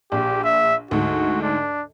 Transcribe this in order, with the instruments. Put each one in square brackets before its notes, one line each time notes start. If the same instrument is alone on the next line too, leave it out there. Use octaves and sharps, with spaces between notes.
[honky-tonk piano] A#1 [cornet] G4
[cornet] E5
[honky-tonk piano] D2 G#2 [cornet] F#4
[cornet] D4